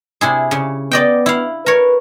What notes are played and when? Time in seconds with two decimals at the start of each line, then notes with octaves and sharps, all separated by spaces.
0.21 C3 E4 G#4
0.51 C#3
0.91 B3 D5 D#5 G5
1.26 E4 F5
1.66 A#4 B4 C#5